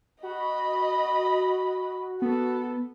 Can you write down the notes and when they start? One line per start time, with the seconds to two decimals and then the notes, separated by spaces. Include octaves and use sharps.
0.23 F#4 D#5 B5
2.22 B3 A4